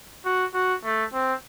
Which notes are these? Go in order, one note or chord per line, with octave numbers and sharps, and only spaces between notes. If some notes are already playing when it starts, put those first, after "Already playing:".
F#4
F#4
A3
C4